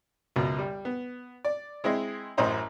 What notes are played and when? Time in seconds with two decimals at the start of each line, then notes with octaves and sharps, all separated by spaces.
0.36 C#2 F#2 B2
0.58 G3
0.85 B3
1.45 D5
1.84 G#3 C4 E4 D#5
2.37 A1 F#2 A2 C5 D#5 A#5